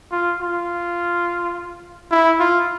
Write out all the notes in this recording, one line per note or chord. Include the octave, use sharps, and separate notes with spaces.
F4
F4
E4
F4